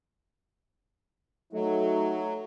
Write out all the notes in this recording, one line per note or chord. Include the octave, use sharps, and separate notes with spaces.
F#3 A3 D#4